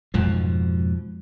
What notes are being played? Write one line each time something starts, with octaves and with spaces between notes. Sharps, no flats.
F2 G#2 B2 F3